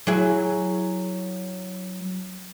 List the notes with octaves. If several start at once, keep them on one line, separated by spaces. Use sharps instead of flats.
F#3 E4 G#4